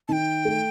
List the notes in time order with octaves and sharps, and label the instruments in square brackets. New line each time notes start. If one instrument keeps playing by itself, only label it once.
[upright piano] D#3 [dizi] G5 A5
[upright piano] A3